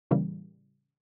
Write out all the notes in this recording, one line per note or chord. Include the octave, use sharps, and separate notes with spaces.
A2 C#3 E3 G3 A#3